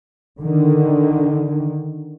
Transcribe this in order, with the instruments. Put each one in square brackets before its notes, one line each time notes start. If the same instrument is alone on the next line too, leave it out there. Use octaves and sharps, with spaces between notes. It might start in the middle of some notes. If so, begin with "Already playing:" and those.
[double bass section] D3 D#3